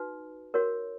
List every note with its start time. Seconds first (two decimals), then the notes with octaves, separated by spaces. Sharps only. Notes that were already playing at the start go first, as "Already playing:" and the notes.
Already playing: D#4 F#4 B4
0.54 F#4 A#4 C#5